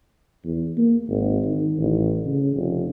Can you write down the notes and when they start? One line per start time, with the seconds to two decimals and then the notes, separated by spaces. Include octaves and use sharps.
0.45 E2
0.77 A#3
1.09 G#1
1.44 D#3
1.78 A1
2.26 C#3
2.55 F1